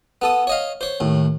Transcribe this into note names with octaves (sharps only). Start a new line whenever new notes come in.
B3 A4 D#6
C#5 D#5 F5
C5 C#5
D#2 A2